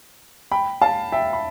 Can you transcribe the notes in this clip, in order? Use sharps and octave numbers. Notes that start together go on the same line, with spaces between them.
G5 B5
F5 A5
E5 G5
B5